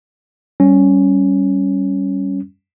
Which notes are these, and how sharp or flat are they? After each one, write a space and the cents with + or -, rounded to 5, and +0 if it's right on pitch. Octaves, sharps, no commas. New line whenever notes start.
G3 -15 C#4 +0